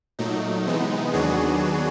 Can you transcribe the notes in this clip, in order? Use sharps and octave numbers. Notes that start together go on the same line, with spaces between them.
A#2 F#3 A3 D#4
C3 E3 G#3 B3
D#2 D#3 F#3 B3 D4 F#4 G#4